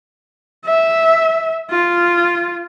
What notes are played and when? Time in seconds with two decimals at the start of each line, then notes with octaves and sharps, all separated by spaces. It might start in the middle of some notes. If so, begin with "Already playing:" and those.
0.65 E5
1.70 F4